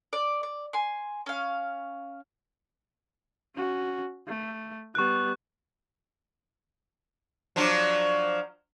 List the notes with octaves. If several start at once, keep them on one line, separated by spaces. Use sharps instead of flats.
D5
D5
G#5 C6
C#4 F5
C#4 F#4
A3
G3 B3 C#6 F#6
F3 F#3 D4